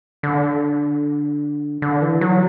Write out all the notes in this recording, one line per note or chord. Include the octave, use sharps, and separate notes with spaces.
D3
D3
E3
F#3